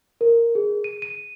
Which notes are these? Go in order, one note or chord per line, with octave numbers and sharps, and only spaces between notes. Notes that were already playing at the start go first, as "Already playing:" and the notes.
A#4
G#4
D#7
D#7